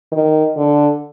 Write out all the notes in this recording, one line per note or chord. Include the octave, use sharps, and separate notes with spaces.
D#3
D3